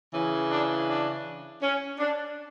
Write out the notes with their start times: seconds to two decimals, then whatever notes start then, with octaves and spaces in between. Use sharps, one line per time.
0.14 C#3 E3
0.51 D4
0.88 D4
1.62 C#4
1.99 D4